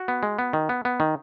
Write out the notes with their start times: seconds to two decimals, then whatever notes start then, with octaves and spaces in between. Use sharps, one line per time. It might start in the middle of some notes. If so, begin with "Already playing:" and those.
Already playing: F#4
0.08 B3
0.23 G#3
0.39 B3
0.53 D#3
0.69 B3
0.85 B3
1.00 D#3